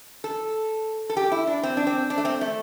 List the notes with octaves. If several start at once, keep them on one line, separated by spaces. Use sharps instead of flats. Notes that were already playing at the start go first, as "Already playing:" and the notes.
A4
A4
G4
E4
D4
C4
D4
C4
D4
A3
C4
A3